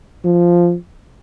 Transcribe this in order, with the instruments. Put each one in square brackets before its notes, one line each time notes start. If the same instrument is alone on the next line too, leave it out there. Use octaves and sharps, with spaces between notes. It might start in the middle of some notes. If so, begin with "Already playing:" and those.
[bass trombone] F3